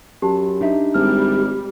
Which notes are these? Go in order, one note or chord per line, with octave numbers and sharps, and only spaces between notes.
F#2 G4 A5
D4 D#4 E5
G#1 G3 F6